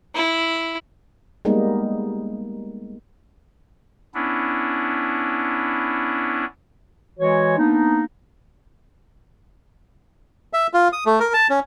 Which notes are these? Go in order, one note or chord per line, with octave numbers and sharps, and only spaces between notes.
E4
G3 G#3 A#3 B3 D#4
B3 C#4 D4 E4
E3 G#3 F#4 C#5
A#3 B3 D4 D#4
E5
F4
D#6
A3
A#4
A5
C#4